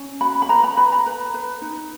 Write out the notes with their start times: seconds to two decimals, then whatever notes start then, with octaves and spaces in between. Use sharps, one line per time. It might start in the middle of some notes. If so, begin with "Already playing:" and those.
Already playing: C#4
0.21 F#4 B5
0.42 B5
0.49 B4 A#5
0.64 B5
0.77 B4 B5
0.92 A#5
1.06 B4
1.34 B4
1.62 D#4